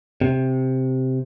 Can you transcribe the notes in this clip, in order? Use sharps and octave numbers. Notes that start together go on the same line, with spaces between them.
C3